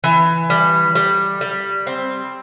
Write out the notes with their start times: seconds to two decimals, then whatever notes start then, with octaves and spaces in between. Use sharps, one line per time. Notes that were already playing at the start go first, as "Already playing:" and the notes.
0.04 E3
0.50 G3
0.95 G3
1.41 G3
1.87 C4